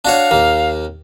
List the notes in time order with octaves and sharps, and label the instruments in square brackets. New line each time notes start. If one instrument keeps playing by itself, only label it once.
[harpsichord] D4 F#4 C#5 [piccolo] F5
[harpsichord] D#2 A#3